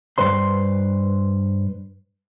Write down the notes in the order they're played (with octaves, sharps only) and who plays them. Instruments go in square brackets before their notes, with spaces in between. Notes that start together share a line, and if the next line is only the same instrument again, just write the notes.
[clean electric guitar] G2 B4 C5 C6